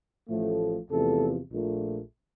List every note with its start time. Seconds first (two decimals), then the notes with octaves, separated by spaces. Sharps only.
0.28 A1 A2 F3 A3
0.88 E2 C3 F3 A3 A4
1.49 A#1 A#2 A3